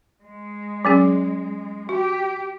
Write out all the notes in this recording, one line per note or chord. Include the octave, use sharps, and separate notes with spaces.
G#3
F#3 C#4 G#4
F#4 G4